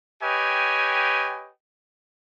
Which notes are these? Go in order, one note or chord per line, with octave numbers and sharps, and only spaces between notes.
G4 B4 C#5 D#5 G5 G#5